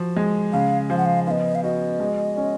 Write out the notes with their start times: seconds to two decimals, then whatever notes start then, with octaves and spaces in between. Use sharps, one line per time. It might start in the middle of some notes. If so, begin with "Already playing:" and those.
Already playing: F3 F#4
0.16 G#3
0.53 C#3 F5
0.90 F3 F5
0.97 F#5
1.05 F5
1.27 B3 D#5 F5
1.55 F5
1.63 F#4 D#5
2.00 G#3
2.37 C#4